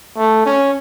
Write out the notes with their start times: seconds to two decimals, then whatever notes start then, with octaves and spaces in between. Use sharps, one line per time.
0.17 A3
0.46 C#4